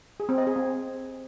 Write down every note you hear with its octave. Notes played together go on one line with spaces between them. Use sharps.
G#4
C4
D#5
G#4
C4